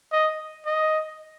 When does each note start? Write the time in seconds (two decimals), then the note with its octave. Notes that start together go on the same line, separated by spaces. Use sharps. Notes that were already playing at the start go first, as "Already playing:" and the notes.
0.12 D#5
0.66 D#5